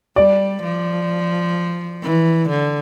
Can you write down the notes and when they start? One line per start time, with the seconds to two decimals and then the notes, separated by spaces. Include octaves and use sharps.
0.16 G3 D5
0.63 F3
2.03 E3
2.50 D3